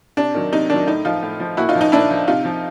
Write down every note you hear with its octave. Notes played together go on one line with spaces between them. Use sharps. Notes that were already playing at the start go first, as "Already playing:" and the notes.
C3 D4
D#3 F#3
C3 D#4
D#3 F#3 D4
A2 D#4
F3 D#4 F4
A2
F3
A#2 E4 F#4
D#4 F4
F3
D#4
A#2 D4 E4
F3
C3 D#4 F4
F3